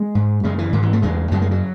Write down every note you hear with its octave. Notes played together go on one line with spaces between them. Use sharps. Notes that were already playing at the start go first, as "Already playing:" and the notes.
Already playing: G#3
G#2
F#2 C#3 G#3
E3
G#2 D#3
E3
A3
E2 C#3 G#3
F#2 C#3 F#3
G#3
F#3